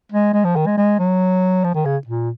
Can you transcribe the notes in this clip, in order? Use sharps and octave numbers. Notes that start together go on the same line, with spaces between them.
G#3
G#3
F3
D#3
G#3
G#3
F#3
F3
D#3
C#3
A#2